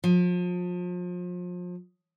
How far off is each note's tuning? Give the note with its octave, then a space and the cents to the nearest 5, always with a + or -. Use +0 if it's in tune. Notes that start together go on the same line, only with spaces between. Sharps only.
F3 +35